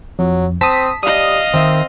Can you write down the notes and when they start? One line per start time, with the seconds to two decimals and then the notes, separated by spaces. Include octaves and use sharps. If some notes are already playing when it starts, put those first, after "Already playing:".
0.19 F2 F#3
0.61 C4 A5 D#6 B6
1.03 G3 D#5 F5 D#6
1.54 D#3 C4 E5